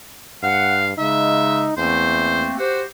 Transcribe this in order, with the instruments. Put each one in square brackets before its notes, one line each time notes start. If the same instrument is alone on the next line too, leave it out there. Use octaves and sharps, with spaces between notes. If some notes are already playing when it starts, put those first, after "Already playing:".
[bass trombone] G2 [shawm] F5 [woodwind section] F#5
[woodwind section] C#3 G#3 [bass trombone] D#4 [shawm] E5
[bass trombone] E2 [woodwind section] A3 A#3 C4 [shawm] C5
[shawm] F#4 [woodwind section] G4 C5